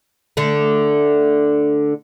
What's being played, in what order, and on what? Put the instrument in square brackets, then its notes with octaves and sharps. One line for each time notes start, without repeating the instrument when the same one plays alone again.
[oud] D3 A3